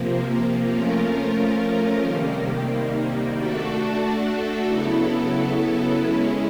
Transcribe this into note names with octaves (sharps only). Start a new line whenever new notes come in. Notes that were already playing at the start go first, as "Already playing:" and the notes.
Already playing: C3 F3 A#3
F3 A3 C#4 F4 A#4
C3 D#3 G3 A#3
A3 D4 F#4 A4
C#3 F#3 B3 E4 A4
G#3 C#4 E4